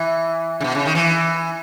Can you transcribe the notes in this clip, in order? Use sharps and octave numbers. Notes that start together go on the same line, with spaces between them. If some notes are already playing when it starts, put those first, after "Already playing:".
Already playing: E3
C#3
B2
C#3
D#3
E3